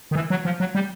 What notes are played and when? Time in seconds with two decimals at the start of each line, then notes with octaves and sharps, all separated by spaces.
0.11 D#3
0.15 E3
0.30 F#3
0.45 F3
0.60 F#3
0.75 G3